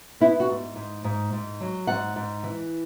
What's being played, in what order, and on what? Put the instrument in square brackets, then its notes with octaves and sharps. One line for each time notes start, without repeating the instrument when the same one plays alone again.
[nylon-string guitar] B3 E4
F#4
G#2
G#2
G#2
G#2
F#3
G#2 F#5
G#2
E3